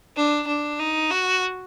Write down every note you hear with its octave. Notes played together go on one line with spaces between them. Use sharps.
D4
D4
D#4
F#4